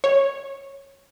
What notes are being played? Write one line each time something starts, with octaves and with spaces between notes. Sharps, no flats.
C#5